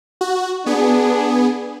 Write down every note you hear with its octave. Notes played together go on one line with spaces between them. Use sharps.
F#4
B3 D4 G#4